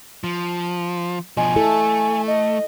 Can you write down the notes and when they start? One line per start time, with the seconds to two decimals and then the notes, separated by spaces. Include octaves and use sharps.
0.24 F3
1.37 B2 F3 D#5 G#5
1.56 A3 E4 A4
2.27 D#5